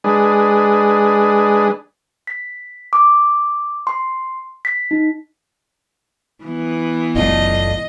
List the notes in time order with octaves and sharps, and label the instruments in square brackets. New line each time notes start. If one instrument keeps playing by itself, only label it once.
[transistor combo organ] G#3 D4 G#4 B4
[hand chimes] B6
D6
C6
B6
D#4
[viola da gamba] E3 B3
[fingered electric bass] F#1 B1 F#2 [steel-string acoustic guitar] A3 D4 F4 [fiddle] D#5